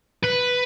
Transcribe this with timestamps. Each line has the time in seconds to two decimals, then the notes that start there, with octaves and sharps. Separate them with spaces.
0.24 B4